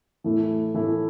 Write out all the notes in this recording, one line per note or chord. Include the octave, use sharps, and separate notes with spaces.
A2 E3 A3 E4
A2 E3 A3 E4